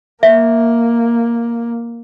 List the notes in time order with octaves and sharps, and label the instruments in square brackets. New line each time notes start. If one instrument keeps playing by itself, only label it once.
[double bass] A#3 [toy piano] E5